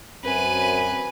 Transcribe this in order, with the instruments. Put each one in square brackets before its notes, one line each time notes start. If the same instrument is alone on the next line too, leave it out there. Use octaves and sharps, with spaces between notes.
[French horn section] F#2 C4 [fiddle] B4 G#5